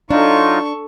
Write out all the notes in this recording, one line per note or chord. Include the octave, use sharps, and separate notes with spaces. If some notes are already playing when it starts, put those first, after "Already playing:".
F#3 D4 D#4 F4 A4 C#6